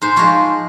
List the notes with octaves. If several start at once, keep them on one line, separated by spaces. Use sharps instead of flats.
G#2 C5
F3 G#3 C#5